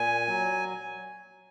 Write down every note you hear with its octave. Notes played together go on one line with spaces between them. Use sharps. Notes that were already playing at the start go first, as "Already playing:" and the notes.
Already playing: A#2 G#5
F#3